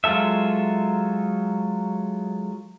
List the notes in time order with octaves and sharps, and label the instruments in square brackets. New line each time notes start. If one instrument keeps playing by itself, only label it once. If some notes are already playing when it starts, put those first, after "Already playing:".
[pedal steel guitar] F#3 G#3 F4 A4 E5